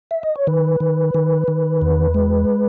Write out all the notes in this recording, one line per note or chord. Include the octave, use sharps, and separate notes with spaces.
E5
D#5
C#5
D#3 B4
D#3
D#3
D#3
E2
G#3